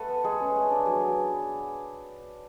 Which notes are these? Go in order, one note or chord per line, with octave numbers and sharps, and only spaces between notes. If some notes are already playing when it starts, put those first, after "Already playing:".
Already playing: A3 A4 B4 F#5
B3
G#3 G#4
C#4
A3
D4
F#3 G#4
B3